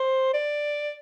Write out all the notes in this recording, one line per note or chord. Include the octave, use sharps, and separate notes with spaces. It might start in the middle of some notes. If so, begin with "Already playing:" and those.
Already playing: C5
D5